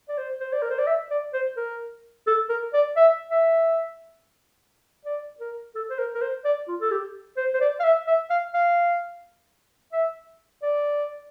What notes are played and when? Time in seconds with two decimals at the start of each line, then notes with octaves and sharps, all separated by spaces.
0.09 D5
0.18 C5
0.41 C5
0.53 D5
0.62 A#4
0.70 C5
0.79 D5
0.87 E5
1.11 D5
1.34 C5
1.57 A#4
2.27 A4
2.49 A#4
2.74 D5
2.96 E5
3.31 E5
5.05 D5
5.40 A#4
5.75 A4
5.90 C5
5.99 A#4
6.14 A#4
6.22 C5
6.45 D5
6.68 F4
6.81 A4
6.91 G4
7.37 C5
7.54 C5
7.61 D5
7.80 F5
7.84 E5
8.07 E5
8.30 F5
8.54 F5
9.93 E5
10.63 D5